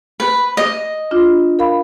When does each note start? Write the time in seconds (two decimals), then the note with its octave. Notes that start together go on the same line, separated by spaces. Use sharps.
0.20 B4
0.57 D#5
1.11 D4 F4
1.59 A#4 F5 B5